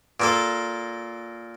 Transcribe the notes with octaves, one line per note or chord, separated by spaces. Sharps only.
A#2 A#3 A4